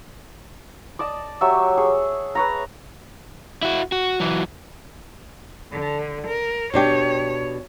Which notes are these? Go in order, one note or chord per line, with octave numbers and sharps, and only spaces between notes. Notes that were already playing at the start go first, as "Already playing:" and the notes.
D5 D#5 A5
F#3 G4 C#5 E5
G#4 C#5
B4 C#5 A#5
E4 F#4
F#4
E3 F#3
D3
A#4
B2 D4 G4 C#5